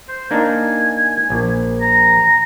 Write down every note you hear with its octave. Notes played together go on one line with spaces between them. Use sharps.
C5
A#3 D4 D#4 G#5
A#1
A#5